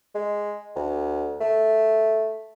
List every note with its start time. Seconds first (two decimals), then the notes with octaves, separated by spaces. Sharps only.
0.15 G#3
0.76 D2
1.41 A3